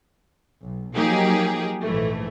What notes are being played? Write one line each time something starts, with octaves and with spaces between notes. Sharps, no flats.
B1
F3 F#3 A#3 D#4 G4 G#4
A#1 G#2 E3 A3